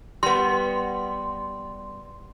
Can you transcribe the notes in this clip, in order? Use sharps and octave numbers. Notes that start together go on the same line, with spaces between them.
G3 B3 C6